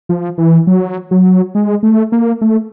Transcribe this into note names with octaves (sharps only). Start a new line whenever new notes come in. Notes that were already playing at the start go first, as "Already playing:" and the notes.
F3
E3
F#3
F#3
G#3
A3
A#3
A3